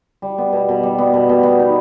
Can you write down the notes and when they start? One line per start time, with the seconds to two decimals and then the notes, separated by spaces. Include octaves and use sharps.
0.22 G3
0.38 B3
0.53 B2
0.69 B2
0.83 G3
0.98 B3
1.13 B2
1.29 B2
1.43 B3
1.59 D#4